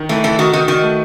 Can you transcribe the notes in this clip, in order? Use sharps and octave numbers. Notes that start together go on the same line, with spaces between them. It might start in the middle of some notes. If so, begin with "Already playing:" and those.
Already playing: D#3
E3 A3
E3 A4
D#3 F#4
D#3 F#4
D#3 F#4
A3